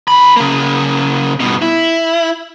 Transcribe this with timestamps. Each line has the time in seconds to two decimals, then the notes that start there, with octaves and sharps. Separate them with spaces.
0.08 D#3 B5
0.36 C#3 A#3
1.40 G2 B2
1.62 E4